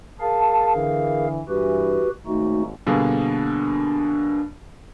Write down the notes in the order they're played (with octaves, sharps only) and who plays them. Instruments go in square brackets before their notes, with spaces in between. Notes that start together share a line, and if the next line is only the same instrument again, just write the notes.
[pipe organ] G#4 A#4 F5 [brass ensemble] A5
[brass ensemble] D3 E3
[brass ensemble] G2 E3 [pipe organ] F#4 G4 B4
[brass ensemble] G#1 D#2 [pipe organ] A3 D#4 F#4
[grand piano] B2 D3 G3 A#3 G#4